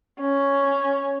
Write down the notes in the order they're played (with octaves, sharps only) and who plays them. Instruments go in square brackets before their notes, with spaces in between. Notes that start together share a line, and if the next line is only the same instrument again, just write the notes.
[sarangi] C#4